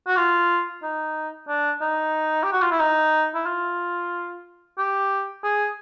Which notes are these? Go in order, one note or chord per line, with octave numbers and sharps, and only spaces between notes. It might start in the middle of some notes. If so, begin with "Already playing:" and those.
F#4
F4
D#4
D4
D#4
G4
F#4
F4
E4
D#4
E4
F4
G4
G#4